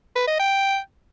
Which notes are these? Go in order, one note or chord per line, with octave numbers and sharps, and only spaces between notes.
B4
D#5
G5